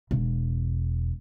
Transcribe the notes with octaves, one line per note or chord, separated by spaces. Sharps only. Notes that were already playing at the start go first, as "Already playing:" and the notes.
E1